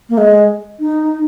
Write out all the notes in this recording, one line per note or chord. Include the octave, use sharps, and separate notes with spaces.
A#3
G#3
D#4